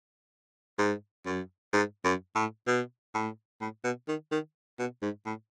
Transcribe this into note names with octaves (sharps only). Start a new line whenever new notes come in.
G#2
F#2
G#2
F#2
A2
B2
A2
A2
B2
D#3
D#3
B2
G#2
A2